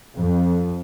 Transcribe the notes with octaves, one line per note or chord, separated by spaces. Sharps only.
F2